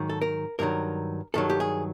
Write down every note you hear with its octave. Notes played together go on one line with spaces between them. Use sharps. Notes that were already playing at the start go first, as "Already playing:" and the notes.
Already playing: G#2 D#3 F#3
A4
A#4
G2 D#3 F#3 A#4
G2 D#3 F#3 A4
G4
G#4